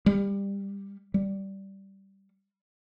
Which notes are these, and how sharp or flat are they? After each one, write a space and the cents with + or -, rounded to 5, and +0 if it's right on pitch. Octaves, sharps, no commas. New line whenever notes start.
G3 +20
G3 -10